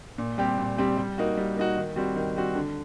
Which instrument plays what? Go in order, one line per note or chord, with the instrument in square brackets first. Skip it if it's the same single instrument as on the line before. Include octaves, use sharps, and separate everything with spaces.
[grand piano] A#2
G3 C4 G4
A#2
G3 C4 G4
G3
A#3 D#4 F#4
G3
A#3 D#4 F#4
D#3
G3 C4 F#4
D#3
G3 C4 F#4
D3